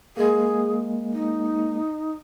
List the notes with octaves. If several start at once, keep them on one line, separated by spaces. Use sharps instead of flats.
G#3 A#3 G#4
D#4